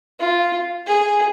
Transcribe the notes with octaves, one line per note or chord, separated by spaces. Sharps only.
F4
G#4